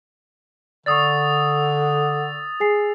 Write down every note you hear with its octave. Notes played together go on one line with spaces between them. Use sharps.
D3 D5 C#6 D#6 E6 A6
G#4 G#5 C7